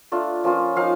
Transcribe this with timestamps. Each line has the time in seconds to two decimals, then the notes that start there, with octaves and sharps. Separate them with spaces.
0.12 A3 D4 F4
0.44 F3 A#3 C#4 F4
0.76 F3 A#3 D#4 F5